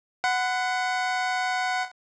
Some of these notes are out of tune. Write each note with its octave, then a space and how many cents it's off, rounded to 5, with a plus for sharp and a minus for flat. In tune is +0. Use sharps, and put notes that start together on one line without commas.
F#5 +0 B5 +40